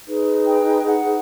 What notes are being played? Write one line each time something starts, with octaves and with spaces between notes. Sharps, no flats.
D#4 G#4 B4
G5
F#5